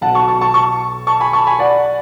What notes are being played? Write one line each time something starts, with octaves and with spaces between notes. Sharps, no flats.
B1 B2 F#5 A5
A5 C#6
A5 C#6
A5 C#6
A5 C#6
A5 C#6
G#5 B5
A5 C#6
G#5 B5
D5 F#5